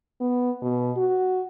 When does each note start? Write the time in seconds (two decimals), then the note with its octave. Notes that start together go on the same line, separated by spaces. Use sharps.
0.21 B3
0.62 B2
0.96 F#4